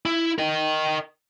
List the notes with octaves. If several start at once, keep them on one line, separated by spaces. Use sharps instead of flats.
E4
A#4 D#5